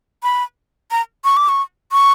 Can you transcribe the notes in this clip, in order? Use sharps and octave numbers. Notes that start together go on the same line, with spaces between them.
B5
A#5
C#6
D6
C#6
C#6